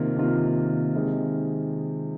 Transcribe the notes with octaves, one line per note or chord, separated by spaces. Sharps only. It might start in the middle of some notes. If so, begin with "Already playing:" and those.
Already playing: C3 D#3 A#3 F4
C3 D#3 A#3 F4
C3 D#3 G#3